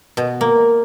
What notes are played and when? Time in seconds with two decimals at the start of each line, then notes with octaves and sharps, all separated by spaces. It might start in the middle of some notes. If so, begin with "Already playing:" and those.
0.17 B2
0.41 A#3